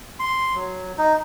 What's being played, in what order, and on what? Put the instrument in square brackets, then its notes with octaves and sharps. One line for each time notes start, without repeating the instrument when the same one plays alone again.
[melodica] C6
F#3
D#4